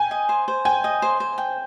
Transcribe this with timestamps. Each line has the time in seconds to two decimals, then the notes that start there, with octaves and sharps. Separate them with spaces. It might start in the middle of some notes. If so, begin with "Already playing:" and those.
Already playing: G5 G#5
0.11 D#5
0.29 C5
0.48 C5
0.65 G5 G#5
0.84 D#5
1.02 C5
1.20 C5
1.38 G5